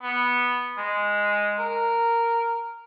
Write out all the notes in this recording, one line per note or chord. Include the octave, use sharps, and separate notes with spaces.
B3
G#3
A#4